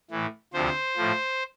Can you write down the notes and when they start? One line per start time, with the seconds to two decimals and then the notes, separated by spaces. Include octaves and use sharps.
0.11 A2 E3
0.53 D2 C3 F3 C5
0.97 A2 F3